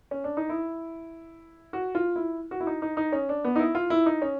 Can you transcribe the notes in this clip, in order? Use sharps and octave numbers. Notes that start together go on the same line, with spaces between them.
C#4
D4
D#4
E4
F#4
F4
E4
F#4
E4
D#4
D#4
D#4
C#4
D4
B3
D#4
E4
F4
E4
D#4
C#4